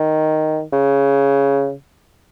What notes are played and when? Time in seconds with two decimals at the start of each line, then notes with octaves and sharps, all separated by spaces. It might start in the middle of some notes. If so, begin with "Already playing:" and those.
Already playing: D#3
0.73 C#3